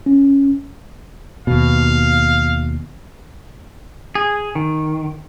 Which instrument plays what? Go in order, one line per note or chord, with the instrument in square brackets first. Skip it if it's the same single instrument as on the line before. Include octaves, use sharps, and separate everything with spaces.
[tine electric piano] C#4
[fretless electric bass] D#2 B2 [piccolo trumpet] F5
[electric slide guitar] G#4
D#3